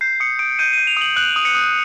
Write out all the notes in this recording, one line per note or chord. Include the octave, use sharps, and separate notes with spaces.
G6 C7
D#6 C#7
D#6 D7
G6 D#7
G6 D#7
F7
D#6 F#7
F#6 F#7
D#6
C#7
D#6